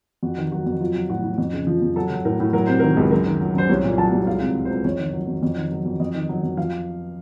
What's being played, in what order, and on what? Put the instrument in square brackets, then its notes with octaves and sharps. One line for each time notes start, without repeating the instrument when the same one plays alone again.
[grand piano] F2 F#4
D#3
F#3 F#4
F2
F#3 F4
F#3
A2 F#4
A2
F2
C#3
F3
F2
F#3 A4
F#3
A2 A#4
A2
F#3 A#4
C3 C5
D#3 A#4
C#2
F#2 A#4
D#3
F#3
F#2 C5
C2 C#5
A#2
F#3 A5
C2
C#2 F5
C3
F#3
C#2 C5
F2 C#5
D#3
F#3
F2
F2
D#3
F#3
F2
F2 D#5
D#3
F#3
F2
F3 F5